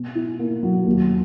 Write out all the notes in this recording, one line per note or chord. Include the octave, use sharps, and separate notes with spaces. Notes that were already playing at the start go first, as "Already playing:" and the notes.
Already playing: B2
E4
A#3
F#3
D#2